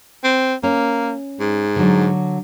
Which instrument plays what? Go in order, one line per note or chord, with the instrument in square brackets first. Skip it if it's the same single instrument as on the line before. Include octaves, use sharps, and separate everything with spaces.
[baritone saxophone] C4
[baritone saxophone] A#3 [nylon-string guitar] C#4
[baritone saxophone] G#2
[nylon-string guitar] D3 F#3